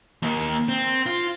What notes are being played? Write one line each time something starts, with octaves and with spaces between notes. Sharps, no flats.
D#2
C4
F4